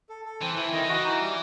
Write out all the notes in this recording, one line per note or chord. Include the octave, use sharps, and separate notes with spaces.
A4
A4
E3 C4
E3 E4
D#3 D#5
E3
F#4
E3
D#4
G3